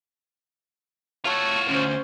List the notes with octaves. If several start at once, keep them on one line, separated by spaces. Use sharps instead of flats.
F4 F#4 C#5 E5 A5
D2 C#4 C5